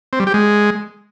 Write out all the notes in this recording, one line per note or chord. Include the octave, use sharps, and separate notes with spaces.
C4
G3
G4
G#3